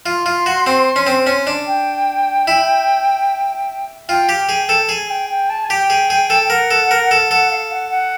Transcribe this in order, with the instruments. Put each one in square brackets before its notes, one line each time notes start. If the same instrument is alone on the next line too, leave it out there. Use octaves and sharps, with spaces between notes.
[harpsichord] F4 [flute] C6
[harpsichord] F4
F#4
C4
C#4
C4
C#4
D4
[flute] G5
[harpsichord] E4
[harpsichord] F4 [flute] G5
[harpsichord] G4
G#4
A4
[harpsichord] G#4 [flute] G#5
[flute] G5
G5
A5
G#5
[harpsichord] G4 [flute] G5
[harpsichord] G#4
G#4
A4
[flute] G5
[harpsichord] A#4 [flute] F#5
[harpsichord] A4
A#4
A4
[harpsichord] A4 [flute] F#5
[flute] F5
F#5
F#5